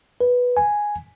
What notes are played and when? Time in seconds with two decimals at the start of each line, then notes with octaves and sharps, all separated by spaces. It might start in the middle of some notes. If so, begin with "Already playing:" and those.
0.21 B4
0.57 G#5